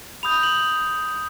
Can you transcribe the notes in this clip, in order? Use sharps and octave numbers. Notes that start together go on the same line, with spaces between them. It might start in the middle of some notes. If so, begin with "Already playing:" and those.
B5 D#6 G6 F7
F#7